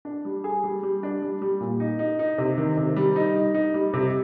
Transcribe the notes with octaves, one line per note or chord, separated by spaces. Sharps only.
D4
G3
G#4
G3
G3
D4
G3
G3
A#2
D#4
D#4
D#4
C3
D#3
C3
G3
D#4
D#4
D#4
G3
C3